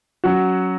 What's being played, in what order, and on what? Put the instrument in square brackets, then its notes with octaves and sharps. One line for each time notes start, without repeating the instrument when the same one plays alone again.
[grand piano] F#3 C#4 F#4